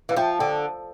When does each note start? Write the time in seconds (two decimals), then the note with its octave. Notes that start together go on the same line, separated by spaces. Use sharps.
0.09 E3 F5
0.17 F3 E5 G5
0.39 D3 G5